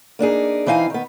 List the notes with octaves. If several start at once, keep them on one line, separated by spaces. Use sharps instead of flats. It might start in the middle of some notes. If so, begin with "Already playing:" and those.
A#3 D4 D#4 G#4
E3 C4 D#4 F5 G#5
D#3 B3